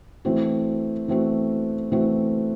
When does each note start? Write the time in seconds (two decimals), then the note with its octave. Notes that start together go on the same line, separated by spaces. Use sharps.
0.25 E3 A3 C4 F#4
1.08 E3 A3 C4 F#4
1.92 E3 A3 C4 F#4